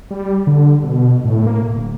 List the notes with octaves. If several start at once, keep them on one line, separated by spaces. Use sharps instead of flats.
G3
D3
B2
A2
A#3
D1